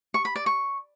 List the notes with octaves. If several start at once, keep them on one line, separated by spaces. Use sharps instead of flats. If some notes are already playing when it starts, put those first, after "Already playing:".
C#6
B5
D5
C#6